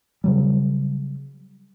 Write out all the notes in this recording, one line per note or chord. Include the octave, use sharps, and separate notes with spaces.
C#3 F#3 G3